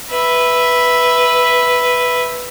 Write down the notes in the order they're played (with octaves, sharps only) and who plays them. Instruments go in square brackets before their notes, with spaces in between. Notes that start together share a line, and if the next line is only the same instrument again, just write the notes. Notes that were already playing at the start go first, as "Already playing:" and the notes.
[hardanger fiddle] B4 E5